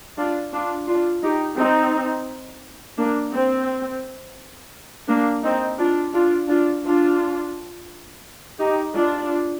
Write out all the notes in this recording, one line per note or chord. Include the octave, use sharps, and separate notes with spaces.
D4 F4
D4 F4
D4 F4
D#4 G4
C4 D#4
A#3 D4
C4
A#3 D4
C4 D#4
D4 F4
D4 F4
D4 F4
D4 F4
D#4 G4
D4 F4